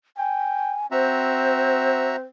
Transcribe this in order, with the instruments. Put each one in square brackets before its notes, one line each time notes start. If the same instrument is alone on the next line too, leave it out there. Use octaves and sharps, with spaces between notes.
[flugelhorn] G5 [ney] G#5
[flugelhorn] C4 [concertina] F#4 E5 A#5 [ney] C5